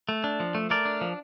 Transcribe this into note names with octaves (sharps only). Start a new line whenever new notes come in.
A3
D4
F3
A3
A3 A#4 D5
D4
F3